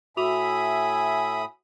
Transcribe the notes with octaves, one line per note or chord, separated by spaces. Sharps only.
A2 F#4 E5 G#5 B5 D6 D#6 F7